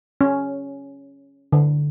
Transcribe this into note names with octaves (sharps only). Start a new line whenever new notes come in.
C#4
D3